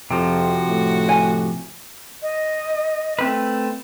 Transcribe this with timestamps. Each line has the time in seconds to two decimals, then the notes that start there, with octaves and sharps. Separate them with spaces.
0.11 F2 C3 F3 F#4
0.68 A2
1.09 G#5
2.22 D#5
3.19 A3 C4 B4